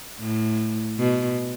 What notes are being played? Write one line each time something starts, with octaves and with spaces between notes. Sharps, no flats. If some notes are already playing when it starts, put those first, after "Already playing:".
A2
B2